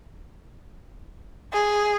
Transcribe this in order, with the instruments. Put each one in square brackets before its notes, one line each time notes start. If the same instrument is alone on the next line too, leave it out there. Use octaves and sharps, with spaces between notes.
[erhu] G#4